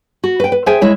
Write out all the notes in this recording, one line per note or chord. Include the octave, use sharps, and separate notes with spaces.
F#4
B4 G5
B4
G#4 C5 E5 G5 G#5
G#3 E4 C#5